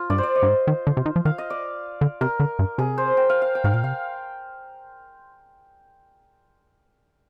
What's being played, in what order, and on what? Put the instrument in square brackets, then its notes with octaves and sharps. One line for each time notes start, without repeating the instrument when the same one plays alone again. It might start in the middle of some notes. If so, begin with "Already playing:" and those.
Already playing: [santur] F4
[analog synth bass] G2 [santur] D5
[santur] C5
D5
D#5
[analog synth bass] G2
G#2
D#3
D3
C3
D#3
F3
[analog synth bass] D#3 [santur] F5
[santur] D#5
D5
[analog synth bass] D3
[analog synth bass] C3 [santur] A#4
[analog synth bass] D3
G2
[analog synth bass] C3 [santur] G#4
[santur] C5
G5
F5
F5
G5
[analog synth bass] G#2 [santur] F5
[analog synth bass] A#2 [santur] G5
[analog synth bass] C3 [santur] F5